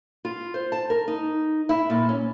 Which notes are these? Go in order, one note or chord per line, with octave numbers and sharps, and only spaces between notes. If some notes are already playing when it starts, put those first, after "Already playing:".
F4
C5
A5
A#4
D#4
E4
A#2
C#4